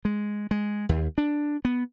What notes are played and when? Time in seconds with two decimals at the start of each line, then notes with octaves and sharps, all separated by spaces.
0.05 G#3
0.51 G#3
0.89 D#2
1.18 D4
1.65 B3